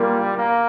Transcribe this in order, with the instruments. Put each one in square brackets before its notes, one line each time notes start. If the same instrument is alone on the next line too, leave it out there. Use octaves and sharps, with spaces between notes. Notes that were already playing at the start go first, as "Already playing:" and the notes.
Already playing: [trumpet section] G3 A#3 F4 [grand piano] A#4
[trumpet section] A#3